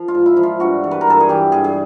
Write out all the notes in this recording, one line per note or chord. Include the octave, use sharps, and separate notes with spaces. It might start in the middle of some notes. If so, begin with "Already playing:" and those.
Already playing: F3
F4
G#2
E4
F3 E4
F4
G2 F#4
E3
B4
A#4
G2 A4
G#4
E3 G4
G2 G#4
G#4